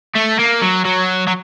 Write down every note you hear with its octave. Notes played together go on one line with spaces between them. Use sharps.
A3
A#3
F#3
F#3
F#3